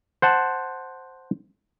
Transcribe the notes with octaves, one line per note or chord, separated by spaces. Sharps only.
C5 F#5 A5